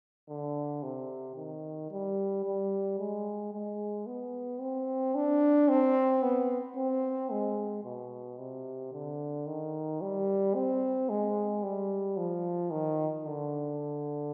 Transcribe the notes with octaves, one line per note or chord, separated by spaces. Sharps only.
D3
C3
D#3
G3
G3
G#3
G#3
B3
C4
D4
C4
B3
C4
G#3
B2
C3
D3
D#3
G3
C4
G#3
G3
F3
D#3
D3